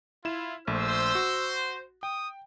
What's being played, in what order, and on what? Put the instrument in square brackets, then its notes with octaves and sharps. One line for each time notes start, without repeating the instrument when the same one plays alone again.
[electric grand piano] E4 E7 [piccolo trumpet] F4
[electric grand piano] A#1 A3 [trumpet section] C5 [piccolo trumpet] E6
[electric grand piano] F#4
[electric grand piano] G5 [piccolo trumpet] D#6